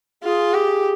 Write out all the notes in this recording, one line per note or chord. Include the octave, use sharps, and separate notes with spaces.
F4 G#4
G4